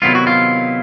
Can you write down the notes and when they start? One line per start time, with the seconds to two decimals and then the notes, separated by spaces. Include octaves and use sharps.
0.02 C3 D#3 F#3 B3 E4 F4
0.15 F#4
0.27 F4